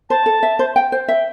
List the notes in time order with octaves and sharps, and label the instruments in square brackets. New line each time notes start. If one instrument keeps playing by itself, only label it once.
[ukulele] C5 [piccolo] A5
[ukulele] A4
E5
C5
G5
C5
[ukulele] E5 [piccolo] G5